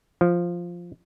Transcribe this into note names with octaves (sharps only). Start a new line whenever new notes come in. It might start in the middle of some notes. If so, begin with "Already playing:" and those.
F3